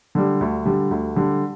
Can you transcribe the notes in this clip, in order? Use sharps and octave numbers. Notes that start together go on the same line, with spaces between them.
D3 G3
D2
D3 G3
D2
D3 G3